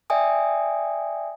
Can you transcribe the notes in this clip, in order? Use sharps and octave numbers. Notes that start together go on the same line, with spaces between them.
D5 E5 G5 G#5 D#6